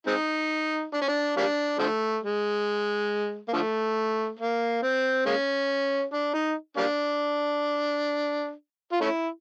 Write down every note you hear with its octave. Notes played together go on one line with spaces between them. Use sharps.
G#3 C4 D#4
D4
C#4
D4
G3 A#3 D4
D3 F3 A3
G#3
A#3
D3 F3 A3
A#3
C4
G#3 A#3 C#4
D4
D#4
G3 A#3 D4
F4
A3 C#4 E4